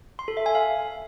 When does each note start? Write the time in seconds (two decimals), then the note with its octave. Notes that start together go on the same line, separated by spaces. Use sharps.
0.19 C6
0.28 A4
0.37 E5
0.46 G#5
0.55 F5